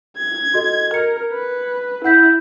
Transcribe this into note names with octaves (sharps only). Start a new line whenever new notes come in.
G#6
F#4 A4 D#5
A#4 G#6 C#7
B4
E4 F#5 G6 B6